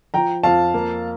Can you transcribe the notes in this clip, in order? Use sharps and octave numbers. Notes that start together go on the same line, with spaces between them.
F3 G5 A#5
F2 F5 A5
A#3